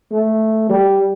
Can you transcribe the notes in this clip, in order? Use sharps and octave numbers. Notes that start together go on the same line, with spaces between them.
A3
G3